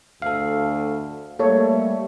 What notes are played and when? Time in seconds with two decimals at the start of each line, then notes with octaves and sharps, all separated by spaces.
0.22 D2 A4 F5
1.39 G3 A3 A#3 A4 C#5